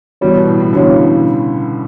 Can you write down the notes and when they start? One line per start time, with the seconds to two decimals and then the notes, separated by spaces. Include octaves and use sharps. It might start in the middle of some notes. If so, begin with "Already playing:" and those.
0.21 E3 G3 B3 F#4 C#5
0.35 B2
0.47 A2
0.60 A2
0.73 D3 E3 B3 F#4 C#5
0.84 C#3
0.94 B2
1.05 C#3